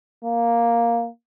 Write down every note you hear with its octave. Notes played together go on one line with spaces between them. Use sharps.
A#3